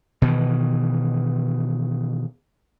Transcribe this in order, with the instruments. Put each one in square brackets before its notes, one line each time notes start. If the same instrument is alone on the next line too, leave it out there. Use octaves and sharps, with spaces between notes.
[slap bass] B2 D#3 E3